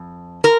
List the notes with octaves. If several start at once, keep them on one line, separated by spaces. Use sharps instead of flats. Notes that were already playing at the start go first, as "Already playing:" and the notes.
Already playing: F2
A#4